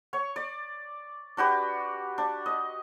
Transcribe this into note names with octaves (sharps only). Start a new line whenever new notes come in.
C#5 C#6
D5
D4 F#4 G4 B4
D4
D#5